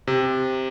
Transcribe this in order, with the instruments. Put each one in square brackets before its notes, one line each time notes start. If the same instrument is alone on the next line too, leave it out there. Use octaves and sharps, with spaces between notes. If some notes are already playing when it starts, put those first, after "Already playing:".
[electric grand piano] C3